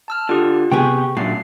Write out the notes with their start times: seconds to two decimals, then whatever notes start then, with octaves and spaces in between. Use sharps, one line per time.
0.08 A5 E6 F6
0.29 D3 F4 G4 D#6
0.72 C3 B3 G4 G#4 G5 C#6
1.17 F#2 A#2 D3 A3 C7